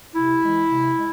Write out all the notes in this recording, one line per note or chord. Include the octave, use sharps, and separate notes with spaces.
C3 E4
E3 G#3
C3
G#3